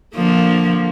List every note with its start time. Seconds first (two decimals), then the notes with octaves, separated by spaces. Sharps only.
0.15 D3 F3 A#3